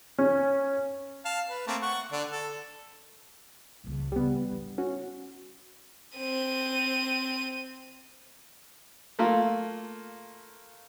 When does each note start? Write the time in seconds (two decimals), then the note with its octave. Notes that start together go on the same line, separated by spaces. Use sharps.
0.18 C#4
1.25 F5 A5
1.49 B4
1.67 A3 A#3 C4
1.82 F#5 C#6
2.12 D3 D4
2.31 A4
3.84 D#1 C#2
4.12 C#3 E3 G3 B3
4.52 D4
4.78 C#4 F#4
6.18 C4 D#7
9.19 A3 A#3 F4